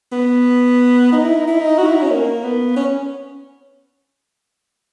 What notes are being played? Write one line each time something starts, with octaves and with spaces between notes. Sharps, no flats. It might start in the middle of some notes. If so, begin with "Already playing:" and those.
B3
D#4
E4
D#4
E4
D#4
F#4
E4
D#4
C#4
A#3
B3
C#4